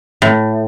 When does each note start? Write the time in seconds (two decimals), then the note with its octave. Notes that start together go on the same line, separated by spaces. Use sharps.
0.22 A2